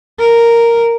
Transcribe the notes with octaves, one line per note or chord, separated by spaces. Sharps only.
A#4